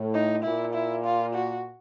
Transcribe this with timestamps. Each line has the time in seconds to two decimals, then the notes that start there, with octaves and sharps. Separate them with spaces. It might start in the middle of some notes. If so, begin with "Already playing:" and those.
Already playing: A2
0.14 D#4
0.44 A#2 E4
0.74 E4
1.05 F4
1.34 F#4